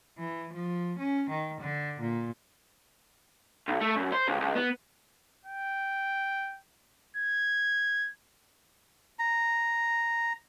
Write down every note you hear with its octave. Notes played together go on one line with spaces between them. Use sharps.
E3
F3
C#4
D#3
D3
A#2
B1
A3
F#2
C5
C#2
C#2
B3
G5
G#6
A#5